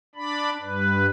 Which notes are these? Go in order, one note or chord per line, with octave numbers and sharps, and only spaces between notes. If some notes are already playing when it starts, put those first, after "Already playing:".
D4 D5 B5
G2 B4